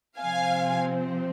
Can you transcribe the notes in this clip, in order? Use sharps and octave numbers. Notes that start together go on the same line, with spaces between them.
C3 F3 C4 F5 G#5